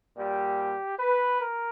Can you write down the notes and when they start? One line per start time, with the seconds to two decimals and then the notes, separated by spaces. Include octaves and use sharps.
0.17 A#2 G3 G4
0.99 B4
1.40 A#4